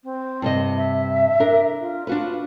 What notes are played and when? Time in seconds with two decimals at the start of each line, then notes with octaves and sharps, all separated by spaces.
0.04 C4
0.42 G2 C3 D#5
0.77 E5
1.40 D4 A#4
1.80 F4
2.07 D4 F4 F#4 B4